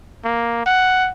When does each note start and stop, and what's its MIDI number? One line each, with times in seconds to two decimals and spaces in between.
0.24 0.65 58
0.66 1.11 78